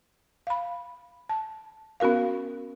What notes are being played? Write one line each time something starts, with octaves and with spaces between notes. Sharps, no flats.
F5 B5
A5
B3 C#4 F#4 A#4 F5